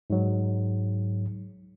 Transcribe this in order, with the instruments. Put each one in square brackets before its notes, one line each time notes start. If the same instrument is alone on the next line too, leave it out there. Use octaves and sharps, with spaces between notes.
[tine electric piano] G#2 F#3